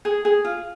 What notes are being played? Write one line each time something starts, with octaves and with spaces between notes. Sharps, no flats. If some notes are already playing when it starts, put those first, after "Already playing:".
G#4
G#4
F4